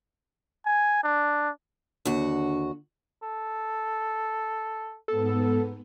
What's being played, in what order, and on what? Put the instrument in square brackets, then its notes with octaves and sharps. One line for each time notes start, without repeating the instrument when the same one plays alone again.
[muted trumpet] G#5
D4
[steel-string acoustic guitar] D#2 F#4 [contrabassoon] D3
[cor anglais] A4
[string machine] G#2 B3 [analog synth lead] A4